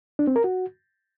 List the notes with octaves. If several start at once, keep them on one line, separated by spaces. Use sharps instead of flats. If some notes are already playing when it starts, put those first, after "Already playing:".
D4
C4
A#4
F#4